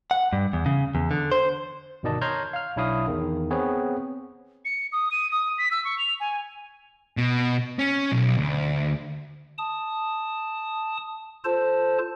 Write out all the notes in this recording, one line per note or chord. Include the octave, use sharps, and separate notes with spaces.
F#5
G2
E2
C#3
E2
D3
C5
G1 B2 D#3 D5 D#5 A5
C#5 A#5 C6 F6 G6 G#6
F5 F6
B1 D4 E4 C#5 F5 D#6
E2 D#3
B3 C4 G#4 B4 C#5
C#7
D#6
D#7
D#6
B6
E6
C#6
F7
G#5
B2
C#4
B1
D2
A5 D#6
F4 A4 C5 A5